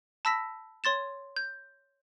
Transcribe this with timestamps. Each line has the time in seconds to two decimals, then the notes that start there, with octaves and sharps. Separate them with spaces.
0.25 A5 B5 E6 A#6 B6 E7
0.84 C#5 C6 A6 E7
1.36 G6